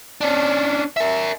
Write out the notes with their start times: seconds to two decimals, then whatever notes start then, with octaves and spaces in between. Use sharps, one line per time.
0.21 C#4 D4
0.97 A#4 E5